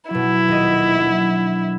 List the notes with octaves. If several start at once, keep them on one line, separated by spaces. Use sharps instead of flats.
B2 F#3 E4
D#1 D#5
F#3 D4